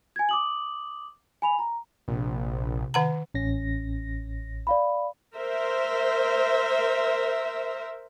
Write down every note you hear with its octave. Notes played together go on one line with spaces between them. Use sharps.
G#5 G#6
D6 D#6 F#7
G#5 B5 F7
A#5
A#1 C3
D#3 F#5 A#5
A1 C#4 A#6
D5 F5 B5
A#4 C5 E5